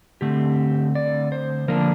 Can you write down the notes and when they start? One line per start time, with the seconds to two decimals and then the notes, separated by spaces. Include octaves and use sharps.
0.21 D3 A3 C4 G4
0.95 D5
1.32 C5
1.68 D3 F3 A#3 D4 A#4